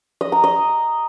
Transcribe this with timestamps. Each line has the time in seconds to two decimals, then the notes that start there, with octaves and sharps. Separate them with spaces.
0.21 D#5
0.32 A#5
0.44 D#5